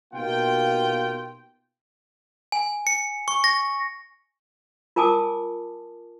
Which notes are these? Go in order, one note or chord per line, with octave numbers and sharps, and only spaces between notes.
B2 A#3 D#4 F4 G4 G5
G#5
C#7
C#6
A#6
F4 A#4 G#5 A5 D6 D#6